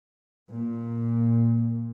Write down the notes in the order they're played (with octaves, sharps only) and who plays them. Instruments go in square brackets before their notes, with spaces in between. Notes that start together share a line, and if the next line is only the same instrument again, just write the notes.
[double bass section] A#2